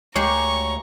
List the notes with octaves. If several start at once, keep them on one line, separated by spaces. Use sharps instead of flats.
D2 G#3 A#3 G4 C#5 A#5 C#6